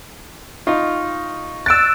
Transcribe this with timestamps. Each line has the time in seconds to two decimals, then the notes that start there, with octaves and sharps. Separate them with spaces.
0.67 D#4 F4 C#6
1.66 E6 F#6 A6 D7 E7